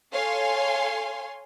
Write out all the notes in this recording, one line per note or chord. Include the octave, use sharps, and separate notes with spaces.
A4 C#5 F5 G#5 C6